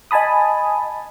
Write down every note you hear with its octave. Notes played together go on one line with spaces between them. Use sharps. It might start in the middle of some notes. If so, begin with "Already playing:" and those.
D#5 G#5 A5 B5 D#6